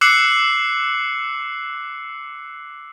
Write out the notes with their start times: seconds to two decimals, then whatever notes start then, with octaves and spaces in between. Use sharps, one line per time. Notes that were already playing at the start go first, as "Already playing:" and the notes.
0.01 D6 E6 F#6 C7 C#7 F#7